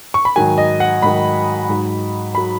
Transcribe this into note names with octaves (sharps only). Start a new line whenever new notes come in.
C#6
B5
G#2 D#3 F#3 G#5
D#5
F#5
G#2 D#3 F#3 B5
G#2 F#3
F#3 B5